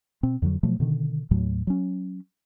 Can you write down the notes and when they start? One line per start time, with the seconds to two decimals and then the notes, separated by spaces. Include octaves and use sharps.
0.23 B2 C4
0.42 F2 D3 D#3 F#3
0.63 B2 F3 F#3 A3
0.80 B2 D3 D#3
1.31 D#2 A2 F#3 A3
1.67 F#3 C#4